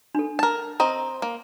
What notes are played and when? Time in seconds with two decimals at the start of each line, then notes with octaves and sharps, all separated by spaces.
0.15 D4 A4
0.39 A#4 A5
0.80 C4 D#5 A#5
1.22 A#3